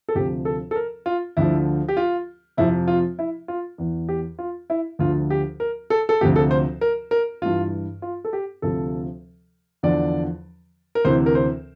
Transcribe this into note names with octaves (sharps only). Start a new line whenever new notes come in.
A4
D2 C3 F3 G4
A4
A4
A#4
F4
D2 D3 F3 E4
G4
F4
F2 C3 F3 E4
F4
E4
F4
E2 E3
G4
F4
E4
D2 D3 F3 F4
G4
A#4
A4
A4
D2 C3 F3 G4
A4
C5
A#4
A#4
G2 E3 F4
F4
A4
G4
D2 C3 F3 A4
E2 D3 F3 D5
A#4
D2 C3 E3 C5
A#4
C5